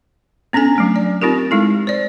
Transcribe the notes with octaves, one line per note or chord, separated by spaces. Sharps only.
B3 C#4 D4 A4 G#5
F#3 A3 D4
D5
C4 D#4 F4 G4 A#4
G#3 E4 A4
C5 D5